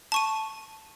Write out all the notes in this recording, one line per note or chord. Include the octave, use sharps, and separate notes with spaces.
A5 C#6 D#7